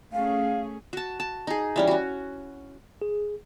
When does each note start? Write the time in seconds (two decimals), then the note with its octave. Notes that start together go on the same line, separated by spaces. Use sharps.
0.13 A3 C#4 G#4 F5
0.93 F#4 A5
1.20 A5
1.47 D#4 G#4
1.76 E3 G3 C#4
1.87 C#4 F#4
3.02 G#4